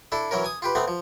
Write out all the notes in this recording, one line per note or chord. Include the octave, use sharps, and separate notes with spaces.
D4 E4 A4
E3 F#3 C#4 A#4
G#5 D#6
F4 G4 B4
A3 B3 C4 F#5
F3